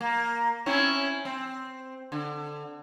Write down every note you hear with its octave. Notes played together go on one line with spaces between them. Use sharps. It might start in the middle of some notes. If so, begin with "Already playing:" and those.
A#3
C4 C#4 E4
C4
D3